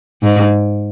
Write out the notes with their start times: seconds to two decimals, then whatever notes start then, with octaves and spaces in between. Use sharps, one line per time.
0.23 G#2